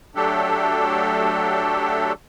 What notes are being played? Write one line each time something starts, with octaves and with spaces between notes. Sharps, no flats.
F#3 A3 D4 G4 A4